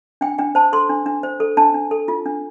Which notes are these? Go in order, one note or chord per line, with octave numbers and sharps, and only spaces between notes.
D4 G5
D4 G5
C5 A5
A4 C6
D4
D4
C5
A4
D4 A5
D4
A4
F4
D4